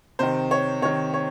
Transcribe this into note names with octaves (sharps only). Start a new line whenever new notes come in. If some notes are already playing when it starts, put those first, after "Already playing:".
C3 D#3 C5
C#5
C3 D#3 C#5
C#5